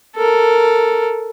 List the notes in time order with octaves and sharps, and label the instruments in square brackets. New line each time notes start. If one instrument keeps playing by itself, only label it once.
[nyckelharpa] A4 A#4